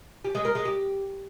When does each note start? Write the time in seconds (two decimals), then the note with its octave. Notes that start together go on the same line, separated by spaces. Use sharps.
0.24 G4
0.35 G#3
0.45 A#4
0.55 G#3
0.65 G4